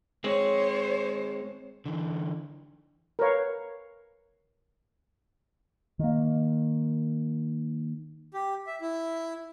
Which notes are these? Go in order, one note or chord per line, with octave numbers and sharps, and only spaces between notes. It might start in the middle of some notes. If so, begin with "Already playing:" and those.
G#3 C4 C5 C#5
D3 E3
A#4 B4 C#5 F5
D#3 A#3
G4
E5
E4